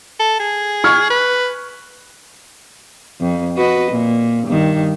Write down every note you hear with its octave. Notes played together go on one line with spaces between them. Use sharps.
A4
G#4
C#6 F6 G#6
B4
F2
F#4 B4 D#5
A#2
G2 D#3